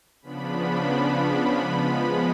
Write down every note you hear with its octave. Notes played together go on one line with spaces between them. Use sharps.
C#3 F3 B3 D4 B5
F3 G#3 B3